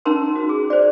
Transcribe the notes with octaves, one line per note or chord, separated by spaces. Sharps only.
C#4 D#4 A#4 A#5 C6
F#4
G#4
C5 D5